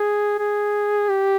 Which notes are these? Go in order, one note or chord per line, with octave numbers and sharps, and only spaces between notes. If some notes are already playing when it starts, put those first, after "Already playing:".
Already playing: G#4
G#4
G4